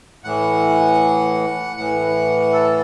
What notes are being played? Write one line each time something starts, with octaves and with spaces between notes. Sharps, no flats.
A2 E3 F#5
A2 E3 F#5
A4